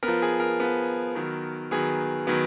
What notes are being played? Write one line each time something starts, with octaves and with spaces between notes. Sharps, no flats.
B3 A#4
F3
G#4
A#4
F3 B3
D#3 F#3 B3
D#3 F#3 B3 G#4
D#3 F#3 B3